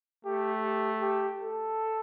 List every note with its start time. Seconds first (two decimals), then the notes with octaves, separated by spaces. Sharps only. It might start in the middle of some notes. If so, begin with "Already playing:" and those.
0.25 A3 G4
0.64 G4
1.02 G4
1.41 A4